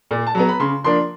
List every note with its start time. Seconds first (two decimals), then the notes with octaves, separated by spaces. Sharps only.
0.11 A#2
0.26 A5
0.35 F#3 B3 A#5
0.49 B5
0.60 C#3 C6
0.84 F3 A#3 D4 C6